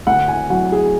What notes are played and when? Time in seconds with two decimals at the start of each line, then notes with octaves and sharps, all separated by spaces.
0.07 D2 F#5
0.28 G#5
0.50 F#3 F#5
0.72 G#4